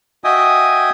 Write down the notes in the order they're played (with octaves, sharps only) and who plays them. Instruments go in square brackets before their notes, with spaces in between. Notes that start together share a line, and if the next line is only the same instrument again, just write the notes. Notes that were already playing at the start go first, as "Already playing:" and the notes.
[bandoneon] F#4 D#5 E5 G5 G#5 D#6